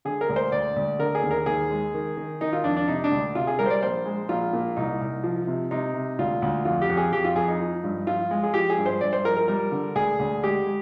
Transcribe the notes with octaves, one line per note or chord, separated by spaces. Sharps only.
D3 G#4
A#4
D2
C5
D2 D5
D2
D3 A#4
G#4
D#2
A#4
D#2 G#4
G#3
D#3
D#3
D#3 D#4
F4
F2 D4
D4
C3 D#4
D4
D2
C3 F4
G#4
G3 A#4
C5
D5
A#1 C5
G#3
A#1 F4
A#2
C2 D#4
C2
F3
C3
C3 D#4
C3
D2 F4
D2
F2 F4
G4
F2
G#4
F2 G4
F4
F2 G#4
D#4
F3
G2
F3 F4
G#3
G#4
F3 G4
G#4
G2
C5
G2 D5
C5
F3 A#4
A#4
G3 A#4
D3
D2 G#4
D2
G#3 G4
G#3